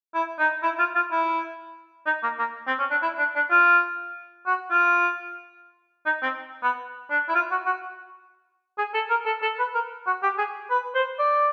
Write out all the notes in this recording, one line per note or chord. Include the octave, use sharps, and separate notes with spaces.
E4
D#4
E4
F4
F4
E4
D#4
A#3
A#3
C4
C#4
D4
E4
D4
D4
F4
F#4
F4
D#4
C4
B3
D4
E4
F4
F#4
F#4
G#4
A4
A#4
A4
A4
B4
A#4
F#4
G4
G#4
B4
C5
D5